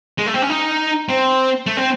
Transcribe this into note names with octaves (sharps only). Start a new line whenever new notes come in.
G#3
A3
C4
C#4
D#4
C4
A3
C4